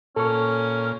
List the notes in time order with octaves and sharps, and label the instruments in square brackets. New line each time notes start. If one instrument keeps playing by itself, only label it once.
[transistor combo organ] A#2 [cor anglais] C#4 [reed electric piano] A4 C#6